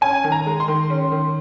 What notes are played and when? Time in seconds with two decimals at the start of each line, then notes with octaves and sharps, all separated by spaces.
0.01 C#4 G#5
0.24 D#3
0.32 A#5
0.46 G#3
0.60 C6
0.68 D#3
0.90 C#4
1.12 D#3